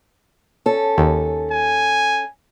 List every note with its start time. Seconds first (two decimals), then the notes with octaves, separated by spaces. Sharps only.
0.66 C#4 A4
0.98 D#2
1.52 G#5